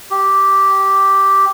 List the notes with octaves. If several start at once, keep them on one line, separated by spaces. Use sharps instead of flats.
G4